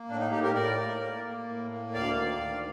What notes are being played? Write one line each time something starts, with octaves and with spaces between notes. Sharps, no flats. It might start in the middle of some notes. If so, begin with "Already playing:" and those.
Already playing: A#3
A2 D4
D#4
A2 D#4 G4
G4 A#4
A2 A#4 D5
A#3
A#3
A#3
A2
A#3
D2 D5 F5
D#3
D2